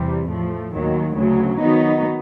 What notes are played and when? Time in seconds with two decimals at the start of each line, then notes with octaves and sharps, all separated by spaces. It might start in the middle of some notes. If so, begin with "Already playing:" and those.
Already playing: E2 C3 E3 G3
0.28 A2 F3 A3
0.72 D#2 D#3 F#3
1.15 D2 C#3 F#3
1.59 D#3 F#3 B3 D#4